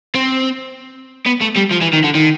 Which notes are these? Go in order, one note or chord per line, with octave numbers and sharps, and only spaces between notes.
C4
B3
A3
G3
F3
E3
D#3
D3
D#3